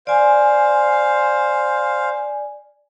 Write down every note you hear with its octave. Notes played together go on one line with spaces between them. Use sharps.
C5 D5 F5 G#5